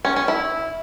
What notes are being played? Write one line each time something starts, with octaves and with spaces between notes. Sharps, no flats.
C#4
C#4
E4